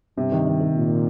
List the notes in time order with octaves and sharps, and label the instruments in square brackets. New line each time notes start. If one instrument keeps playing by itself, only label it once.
[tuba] G2 [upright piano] C3
[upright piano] D#3
D#3
D#3
[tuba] A#2